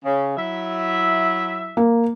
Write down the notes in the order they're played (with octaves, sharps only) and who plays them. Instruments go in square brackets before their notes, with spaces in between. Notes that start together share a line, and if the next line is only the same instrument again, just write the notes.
[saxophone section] C#3
F#3 E4 E5
[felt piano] A#3